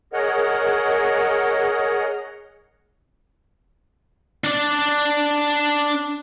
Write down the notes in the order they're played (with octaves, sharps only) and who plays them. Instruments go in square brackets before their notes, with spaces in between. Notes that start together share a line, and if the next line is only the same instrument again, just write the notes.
[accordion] G#4 A#4 C#5 D#5 F#5
[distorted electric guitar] D4 D5